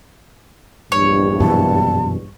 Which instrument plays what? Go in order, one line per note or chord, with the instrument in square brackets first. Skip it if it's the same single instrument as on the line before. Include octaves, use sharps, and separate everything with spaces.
[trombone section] A#1 E2 G2 [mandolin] C#5
[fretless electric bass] F#2 B2 E3 [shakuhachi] A5